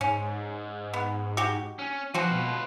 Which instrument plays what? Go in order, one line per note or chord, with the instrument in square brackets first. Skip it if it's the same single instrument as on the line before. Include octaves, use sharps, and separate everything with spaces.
[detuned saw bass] G#2 [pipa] C#4
[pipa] B3
F#4 G4
[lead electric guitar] C#4
[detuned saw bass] F3 [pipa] C4 F#4 [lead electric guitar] F4 B4
[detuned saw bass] B2